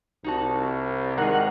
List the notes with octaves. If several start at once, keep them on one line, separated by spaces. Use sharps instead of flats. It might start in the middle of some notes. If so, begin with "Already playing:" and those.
C2 D#4 F#4 A5
G#2 D#3 G#4 A#4 F#5